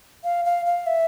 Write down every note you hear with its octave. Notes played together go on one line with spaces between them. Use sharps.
F5
F5
F5
E5